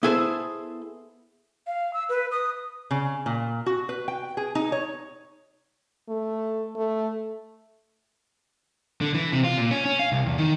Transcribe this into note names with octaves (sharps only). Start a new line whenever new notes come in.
B3 E4 G#4 A4 C5
F5
E6
B4
D#6
C#3
A#2
F#4
B4
G5
G#4
D#4
C#5
A3
A3
D3
E3
C3
F4
A#2
C#4
C#4
F5
C2
E2
D#3